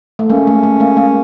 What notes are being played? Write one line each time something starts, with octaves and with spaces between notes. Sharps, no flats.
A3
G#3 A#3 C#4
A3
A3
G#3 A#3
G#3 A#3